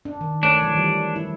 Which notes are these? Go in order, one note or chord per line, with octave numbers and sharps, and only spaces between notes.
D4
D#3
A3 D4 C#5
D#3 F3 F#3
E3 G3
E4